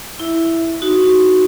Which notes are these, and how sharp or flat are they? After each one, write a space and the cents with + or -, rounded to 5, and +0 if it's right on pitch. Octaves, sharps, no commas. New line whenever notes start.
E4 +0 E5 +0
D#4 +0 F#4 +0